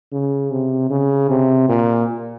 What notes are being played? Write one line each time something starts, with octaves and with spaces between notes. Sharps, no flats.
C#3
C3
C#3
C3
A#2